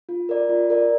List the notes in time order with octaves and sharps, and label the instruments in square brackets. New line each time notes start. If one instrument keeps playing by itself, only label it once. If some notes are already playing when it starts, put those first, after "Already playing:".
[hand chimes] F4
A#4 D5
F4
A#4 D5